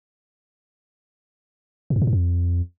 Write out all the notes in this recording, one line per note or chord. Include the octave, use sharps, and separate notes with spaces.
A2
F2
A2
G2
F2